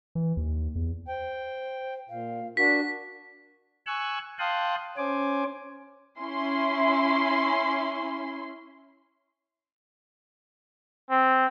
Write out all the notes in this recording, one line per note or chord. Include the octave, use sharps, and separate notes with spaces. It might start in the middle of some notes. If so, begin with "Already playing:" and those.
E3
D#2
E2
C5 G5
A#2 F5
D4 F#4 A#4 B6
G#5 C#6 E6 F#6
F5 G5 A5 C6 D#6 F#6
C#4 C5 G#5 D6
C#4 E4 C6
C4